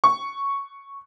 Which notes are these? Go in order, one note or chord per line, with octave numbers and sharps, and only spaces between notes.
C#6